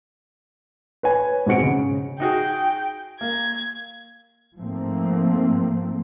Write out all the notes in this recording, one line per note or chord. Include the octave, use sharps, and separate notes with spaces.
B4 C#5 G#5
G#2 B2 C4 F#4 C#7 D7
C#3
D#4 F#4 G#4 G5
A#3 G#6
G#2 F3 A3 A#3 C4